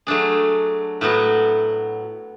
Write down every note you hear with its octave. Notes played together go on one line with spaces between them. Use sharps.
F#3 A3 D4 G#4
A2 F#3 B3 F#4